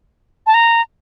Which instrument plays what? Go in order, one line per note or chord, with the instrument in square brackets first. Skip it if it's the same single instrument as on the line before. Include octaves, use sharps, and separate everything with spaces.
[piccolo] A5
A#5